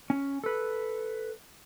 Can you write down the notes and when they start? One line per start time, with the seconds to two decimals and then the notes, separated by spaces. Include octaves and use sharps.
0.10 C#4
0.44 A4 B4